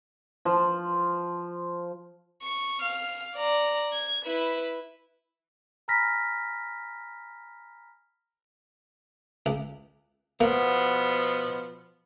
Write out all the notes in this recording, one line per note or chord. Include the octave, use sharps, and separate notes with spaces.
F3
C#6
F5 F6
D5 A#5
G#6
E4 B4
G#5 A#5 B5 F6 A#6 B6
C#2
B2 F3 A#3 B3